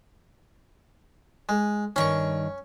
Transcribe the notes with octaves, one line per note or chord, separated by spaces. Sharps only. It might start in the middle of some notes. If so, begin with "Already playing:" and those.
G#3
G2 D#3 C#4 C#6